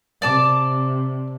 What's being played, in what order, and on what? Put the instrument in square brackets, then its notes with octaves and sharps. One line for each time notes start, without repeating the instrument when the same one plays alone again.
[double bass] C3 [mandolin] D5 A5 D6